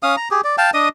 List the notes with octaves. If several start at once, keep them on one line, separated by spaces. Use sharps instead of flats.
C#4 F5 D#6
A#5
G4 G#4
D5
F5 G5 A5
D4 D#5 D#6